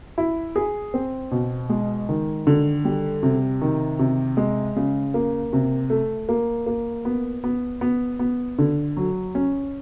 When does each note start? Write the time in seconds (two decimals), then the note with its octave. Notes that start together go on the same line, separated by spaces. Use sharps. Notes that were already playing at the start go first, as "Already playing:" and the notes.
0.18 E4
0.56 G#4
0.94 C4
1.31 B2
1.70 G#3
2.09 D#3
2.47 D3
2.85 G3
3.23 C3
3.62 D#3
3.99 C3
4.37 G#3
4.76 C#3
5.14 A#3
5.53 C3
5.90 A3
6.29 A#3
6.66 A#3
7.05 B3
7.44 B3
7.81 B3
8.19 B3
8.58 D3
8.97 F#3
9.35 C#4